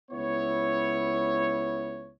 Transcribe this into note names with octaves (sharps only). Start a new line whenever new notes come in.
C#2 B3 E4 C#5